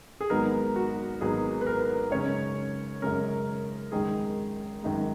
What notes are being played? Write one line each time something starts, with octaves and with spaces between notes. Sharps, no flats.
G#4
G#1 G#2 F#3 B3 D#4 A#4
F#4
G#1 G#2 F#3 B3 D#4 G#4
B4
A#4
F#2 C#3 G#3 C#4 C#5
F#2 C#3 G#3 C#4 A#4
G#1 F#2 D#3 G#3 G#4
G#1 F#2 D#3 G#3